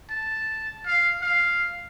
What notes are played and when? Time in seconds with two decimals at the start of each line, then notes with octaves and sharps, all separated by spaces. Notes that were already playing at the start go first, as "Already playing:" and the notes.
0.10 A5
0.87 F5
1.22 F5